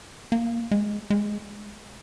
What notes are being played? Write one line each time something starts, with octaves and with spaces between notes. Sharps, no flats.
A#3
G#3
G#3